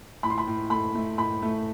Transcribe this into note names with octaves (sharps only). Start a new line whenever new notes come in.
A2 B5
C6
B5
A2
A3 B5
A3
A2 B5
A3